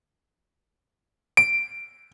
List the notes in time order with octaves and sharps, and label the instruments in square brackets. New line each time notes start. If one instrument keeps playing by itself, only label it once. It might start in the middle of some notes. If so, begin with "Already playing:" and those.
[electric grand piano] D7